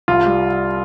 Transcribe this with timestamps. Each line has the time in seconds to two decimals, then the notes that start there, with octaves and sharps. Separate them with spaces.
0.08 C2 F4
0.26 G3